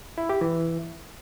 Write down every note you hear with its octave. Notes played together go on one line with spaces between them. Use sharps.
E4
G4
E3